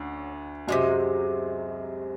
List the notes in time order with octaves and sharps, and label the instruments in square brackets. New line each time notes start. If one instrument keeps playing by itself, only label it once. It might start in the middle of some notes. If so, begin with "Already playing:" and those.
Already playing: [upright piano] D2 D3 [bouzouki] C#4
[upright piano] F#2 F#3 [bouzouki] C3 F3 G#3